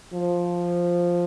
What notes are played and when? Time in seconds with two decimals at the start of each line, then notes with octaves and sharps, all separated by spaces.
0.13 F3